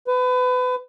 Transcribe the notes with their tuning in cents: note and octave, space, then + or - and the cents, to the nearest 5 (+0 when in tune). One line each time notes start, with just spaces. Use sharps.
B4 +30